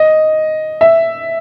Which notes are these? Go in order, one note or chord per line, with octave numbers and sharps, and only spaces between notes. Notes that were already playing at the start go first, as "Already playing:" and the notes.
Already playing: D#5
E5